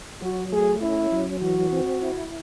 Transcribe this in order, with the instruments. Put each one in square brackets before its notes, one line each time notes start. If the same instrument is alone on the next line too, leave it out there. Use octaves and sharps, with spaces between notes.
[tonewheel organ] F#3 [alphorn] F#4
[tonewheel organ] A3 [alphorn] G#4
[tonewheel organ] C#4 [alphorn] E4
[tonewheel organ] F#3
[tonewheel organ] E3 [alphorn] F#4
[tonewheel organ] C4
E4